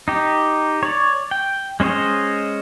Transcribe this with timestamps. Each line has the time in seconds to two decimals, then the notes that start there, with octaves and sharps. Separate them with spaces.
0.08 D#4 G4
0.83 C#5 D5
1.31 G5
1.80 G#3 C#4 C5 C#5 D#5